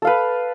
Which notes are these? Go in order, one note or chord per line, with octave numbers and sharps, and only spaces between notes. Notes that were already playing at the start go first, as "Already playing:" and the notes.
A4 B4 F5